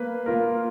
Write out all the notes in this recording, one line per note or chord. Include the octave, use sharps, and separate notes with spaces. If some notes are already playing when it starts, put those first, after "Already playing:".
Already playing: A#3 B4 F5
A#3 F4 A#4